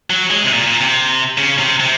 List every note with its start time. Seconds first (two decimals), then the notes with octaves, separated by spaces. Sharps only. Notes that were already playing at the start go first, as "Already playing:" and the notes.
0.10 F#3
0.31 G#3
0.43 C3
0.53 A#2
0.66 A#2
0.81 C3
1.38 C#3
1.59 C3
1.80 C3